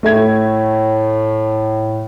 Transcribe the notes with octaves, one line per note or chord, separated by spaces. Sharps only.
A2 A3 E5 G#6